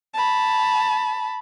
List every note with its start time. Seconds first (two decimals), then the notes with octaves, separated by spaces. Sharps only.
0.14 A5 B5